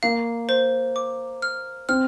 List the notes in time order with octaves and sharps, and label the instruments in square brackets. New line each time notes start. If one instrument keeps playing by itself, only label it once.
[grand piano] A#3 [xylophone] F5
[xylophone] C5
D6
F6
[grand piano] C4 [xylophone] F6